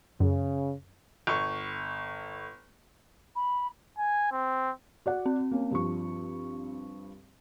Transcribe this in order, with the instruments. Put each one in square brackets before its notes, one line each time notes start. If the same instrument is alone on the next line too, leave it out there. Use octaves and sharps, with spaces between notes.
[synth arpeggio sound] F#2 [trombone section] C#3
[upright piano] G1 C#6
[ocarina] B5
[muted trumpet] G#5
C4
[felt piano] F#4 D5 F#5
[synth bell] C4
[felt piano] A#3 C#4
G2 F3 C#6